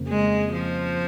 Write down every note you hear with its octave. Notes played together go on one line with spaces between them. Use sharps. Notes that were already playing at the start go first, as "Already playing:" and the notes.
Already playing: F2 C#3 A#3
G#3
F3